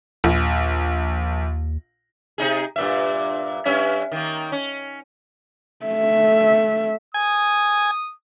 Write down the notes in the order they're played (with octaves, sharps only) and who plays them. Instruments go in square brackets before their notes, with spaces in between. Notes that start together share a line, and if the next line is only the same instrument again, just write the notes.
[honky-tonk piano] A#1 [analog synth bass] D#2
[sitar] C3 D#4 G#4
G2 A#2 E5
G2 C#4 E5
D#3 A#3
C#4
[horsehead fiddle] A3 E5
[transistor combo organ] G#5 [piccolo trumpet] D#6